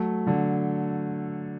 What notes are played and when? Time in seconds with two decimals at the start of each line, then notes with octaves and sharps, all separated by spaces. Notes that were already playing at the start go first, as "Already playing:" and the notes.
Already playing: F#3 A3
0.27 D3 F#3